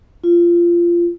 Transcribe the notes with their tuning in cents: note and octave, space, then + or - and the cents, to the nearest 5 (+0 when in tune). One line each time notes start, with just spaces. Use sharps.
F4 -20